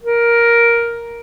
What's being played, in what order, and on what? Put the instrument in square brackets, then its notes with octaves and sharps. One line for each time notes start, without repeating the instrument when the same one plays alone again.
[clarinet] A#4